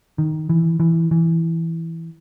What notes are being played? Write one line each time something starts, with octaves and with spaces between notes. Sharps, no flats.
D#3
E3
E3
E3